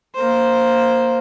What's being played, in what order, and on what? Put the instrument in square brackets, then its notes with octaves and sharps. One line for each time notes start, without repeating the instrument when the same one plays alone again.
[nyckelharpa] A#3 C5